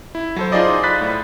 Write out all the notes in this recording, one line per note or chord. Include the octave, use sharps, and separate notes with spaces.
E4
F#3 A4 C5
D#4 F4 G#4 C5 D5 D#5
B5 F#6 A6 B6
A2